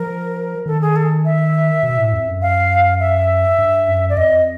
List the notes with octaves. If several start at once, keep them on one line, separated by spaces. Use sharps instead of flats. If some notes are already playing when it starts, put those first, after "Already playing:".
Already playing: F3 A#4
D#3 A4
G#4
A4
E5
B2
A2
F2
F#2
F5
E5
G2
F#2
D5
F2 D#5